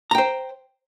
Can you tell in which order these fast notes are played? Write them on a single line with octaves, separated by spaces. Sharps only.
A#5 G5 C5